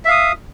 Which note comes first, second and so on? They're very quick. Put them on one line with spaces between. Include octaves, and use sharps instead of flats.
E5 F5 D#6